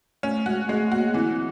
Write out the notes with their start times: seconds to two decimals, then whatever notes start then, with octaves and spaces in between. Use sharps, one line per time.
0.23 A3 C#4
0.46 G#3 F#4
0.69 G#3 A3
0.92 A#3 F#4
1.14 E3 C4